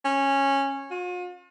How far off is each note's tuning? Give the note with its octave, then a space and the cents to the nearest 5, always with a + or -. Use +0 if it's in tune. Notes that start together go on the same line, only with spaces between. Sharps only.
C#4 -10
F4 +45